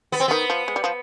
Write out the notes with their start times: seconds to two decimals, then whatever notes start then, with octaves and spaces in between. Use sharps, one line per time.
0.12 B3
0.20 C4
0.28 D#3 B3
0.50 F3
0.68 G#3
0.76 G3
0.84 F3